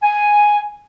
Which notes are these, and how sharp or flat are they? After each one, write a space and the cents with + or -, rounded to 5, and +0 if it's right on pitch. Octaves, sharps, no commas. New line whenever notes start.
G#5 +0